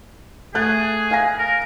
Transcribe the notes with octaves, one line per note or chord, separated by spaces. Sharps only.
A3 G#4 F#6 A6
F5 G#5 A#6
A#4